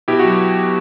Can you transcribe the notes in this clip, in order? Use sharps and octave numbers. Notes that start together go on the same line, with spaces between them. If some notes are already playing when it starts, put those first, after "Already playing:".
B2 E4 G4
F#4
F#3